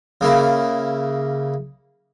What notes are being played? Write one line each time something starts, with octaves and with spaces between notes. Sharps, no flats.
C#3 A#3 E4